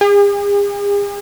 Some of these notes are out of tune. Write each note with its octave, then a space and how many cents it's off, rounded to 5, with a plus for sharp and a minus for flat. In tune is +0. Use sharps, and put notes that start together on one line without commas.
G#4 -45